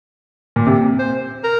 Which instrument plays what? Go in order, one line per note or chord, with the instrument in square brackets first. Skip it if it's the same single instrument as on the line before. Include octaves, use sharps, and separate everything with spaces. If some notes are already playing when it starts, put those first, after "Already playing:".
[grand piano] A#2
C3
[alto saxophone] C5
A#4